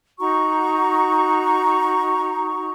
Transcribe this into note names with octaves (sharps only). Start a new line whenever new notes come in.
D#4 F#4 A#5 C#6